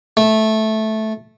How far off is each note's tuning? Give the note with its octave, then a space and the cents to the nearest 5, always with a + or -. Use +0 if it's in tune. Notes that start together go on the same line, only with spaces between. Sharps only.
A3 -10